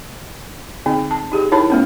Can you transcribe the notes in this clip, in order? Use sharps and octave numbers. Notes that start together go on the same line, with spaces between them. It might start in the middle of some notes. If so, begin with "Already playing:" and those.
D3 C4 D#4
A5
D#4 G4 G#4
D#4 E4 A#4 C#5 A5 B5
A3 B3 C#4